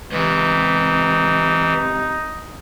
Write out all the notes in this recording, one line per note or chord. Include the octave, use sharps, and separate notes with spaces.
C#2 C3 E3 D#4